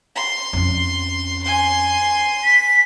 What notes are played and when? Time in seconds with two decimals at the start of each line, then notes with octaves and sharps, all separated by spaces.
0.16 C6
0.53 F2 C#4
1.43 G#5 C6
2.44 B6